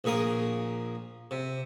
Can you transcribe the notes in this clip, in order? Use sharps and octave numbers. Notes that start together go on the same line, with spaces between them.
A#1 A#2 G#4 A#4 D#6
C3